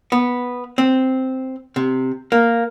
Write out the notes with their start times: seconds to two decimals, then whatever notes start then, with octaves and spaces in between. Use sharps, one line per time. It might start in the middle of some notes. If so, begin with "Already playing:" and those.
0.12 B3
0.78 C4
1.76 C3
2.32 A#3